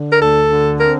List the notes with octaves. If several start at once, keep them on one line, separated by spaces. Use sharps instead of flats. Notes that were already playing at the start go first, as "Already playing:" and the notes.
Already playing: D3
A#4
D2 A4
D3
C4 A#4